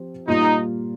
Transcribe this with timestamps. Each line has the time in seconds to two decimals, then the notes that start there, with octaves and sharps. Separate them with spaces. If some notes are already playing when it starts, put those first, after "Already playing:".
Already playing: F3 C4 G4
0.28 A#2 G3 A#3 D#4 F4